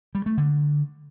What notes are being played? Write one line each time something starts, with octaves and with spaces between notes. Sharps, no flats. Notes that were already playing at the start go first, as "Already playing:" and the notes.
G3
A3
D3